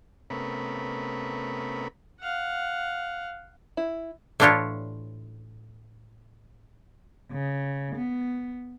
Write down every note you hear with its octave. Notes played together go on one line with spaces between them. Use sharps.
C3 A3 B3 C#4 A#4 B5
F5 F#5
E4
A2 E3 D4 F4 G4 C#5
C#3
B3